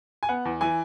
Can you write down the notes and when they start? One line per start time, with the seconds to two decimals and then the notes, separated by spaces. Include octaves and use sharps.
0.23 G#5
0.29 B3 F#5
0.45 E2
0.61 E3 G#5